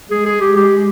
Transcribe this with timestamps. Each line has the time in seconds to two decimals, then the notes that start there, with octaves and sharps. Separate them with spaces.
0.11 G#3 G#4
0.26 G#4
0.41 G4
0.56 G#3 G4